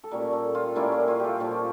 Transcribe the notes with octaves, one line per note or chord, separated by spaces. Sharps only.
A4
A#2 G3 A#3 C#4 A#4
A4
F4
A#2 G3 A#3 C#4 E4
F4
F4
G4 A4
A#2 F3 A#3 C#5